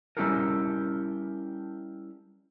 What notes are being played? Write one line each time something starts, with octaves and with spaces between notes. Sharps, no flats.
G3 C#4 E4 G4 A4 A#4